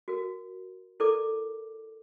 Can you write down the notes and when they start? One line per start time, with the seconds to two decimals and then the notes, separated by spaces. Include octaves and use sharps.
0.08 F#4 A#4
1.00 E4 A4 A#4 D5 D6